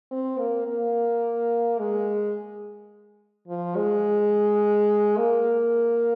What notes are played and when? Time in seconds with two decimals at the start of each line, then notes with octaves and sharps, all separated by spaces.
0.11 C4
0.39 A#3
0.67 A#3
1.79 G#3
3.48 F3
3.76 G#3
5.17 A#3